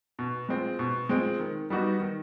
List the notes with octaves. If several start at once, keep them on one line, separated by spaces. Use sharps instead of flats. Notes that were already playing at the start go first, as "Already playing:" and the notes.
B2
G#3 C4 F4
B2
G#3 C4 F4
D#3
G3 B3 D#4 F#4
D#3